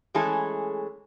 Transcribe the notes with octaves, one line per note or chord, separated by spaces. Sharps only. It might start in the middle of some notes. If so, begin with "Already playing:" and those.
E3 G#3 A3 C#4 G#4 A4